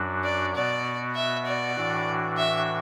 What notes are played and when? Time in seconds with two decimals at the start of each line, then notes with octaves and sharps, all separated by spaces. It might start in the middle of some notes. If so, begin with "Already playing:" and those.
Already playing: F#2 F#3 D4 F#4
0.24 D5
0.55 B2 B3 F#4 D5
1.15 E5
1.45 D5
1.76 A2 E3 D4 F#4
2.37 E5